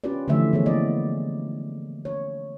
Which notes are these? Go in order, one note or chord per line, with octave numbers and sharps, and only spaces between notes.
C#4 F4 G4 B4 D5
D3 E3 F3 A3 E5
E3 F3 B3 G#4 C#5
A#3 D5 D#5
C#5